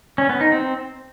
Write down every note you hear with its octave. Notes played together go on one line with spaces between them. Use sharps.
C#4
B3
D#4
C4